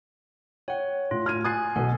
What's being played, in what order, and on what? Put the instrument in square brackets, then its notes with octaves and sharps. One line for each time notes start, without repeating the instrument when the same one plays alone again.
[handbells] C#5 F#5 [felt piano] G5
[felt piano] A2 [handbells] F4
[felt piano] F6 G#6 D#7
[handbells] G#5 F#6 G#6 [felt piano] D#6 A6 C7
[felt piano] B1 B2 [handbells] A4 F#5